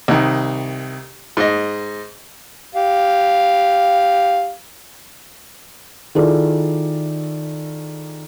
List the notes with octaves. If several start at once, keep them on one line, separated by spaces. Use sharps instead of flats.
C2 D#3
G#2 D#5
G4 F5
D#3 E4 F4 G#4 A4 D5